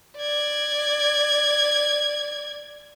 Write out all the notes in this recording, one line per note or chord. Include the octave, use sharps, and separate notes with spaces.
D5 G#6